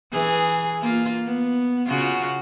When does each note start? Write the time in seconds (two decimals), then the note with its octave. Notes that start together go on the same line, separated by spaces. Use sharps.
0.12 E3 G#4
0.81 A#3 F4
1.27 B3
1.87 C#3 F4 F#4